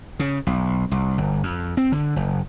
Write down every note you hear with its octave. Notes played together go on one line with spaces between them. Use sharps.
C#3
B1
C2
G1
F2
C4
D3
F#1